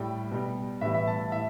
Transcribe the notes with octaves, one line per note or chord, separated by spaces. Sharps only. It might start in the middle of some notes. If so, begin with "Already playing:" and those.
Already playing: A2 G3 G5
B2 G3
A2 E3 G3 E5
E5
A5
A5
A2 E5